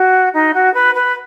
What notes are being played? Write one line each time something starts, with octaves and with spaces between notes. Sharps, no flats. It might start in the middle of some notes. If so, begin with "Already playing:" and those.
Already playing: F#4
D#4
F#4
B4
B4